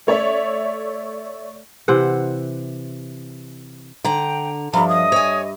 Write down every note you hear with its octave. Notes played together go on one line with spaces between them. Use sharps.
A3 C#5 D5 E5
C3 E3 C5 F#5
D3 G5 A#5
G2 F3 E5 A#5 B5
D#5 D#6
C#5 G#5